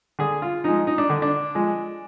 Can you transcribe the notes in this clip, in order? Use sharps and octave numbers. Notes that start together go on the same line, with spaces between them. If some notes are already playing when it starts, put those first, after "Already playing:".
D3 G#4
F4
F3 G#3 D#4
D#4
D4
D3
D4
F3 G#3